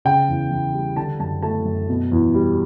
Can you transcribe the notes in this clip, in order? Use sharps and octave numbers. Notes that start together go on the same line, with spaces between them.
C#3 G5
E2
E3
G3
D3 A5
F#2 A5
A3 A5
F#2
B2
E2
G3